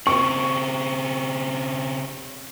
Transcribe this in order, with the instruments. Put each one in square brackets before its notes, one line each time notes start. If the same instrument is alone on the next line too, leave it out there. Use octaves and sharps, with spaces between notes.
[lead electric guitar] C#3 C4 [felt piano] C#6